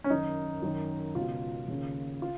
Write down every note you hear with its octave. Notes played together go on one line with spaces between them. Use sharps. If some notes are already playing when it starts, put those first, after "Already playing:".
C#4
F#2 D#3 D#4
F#2 D#3
C#2 B2 F4
D#2 C#3
F4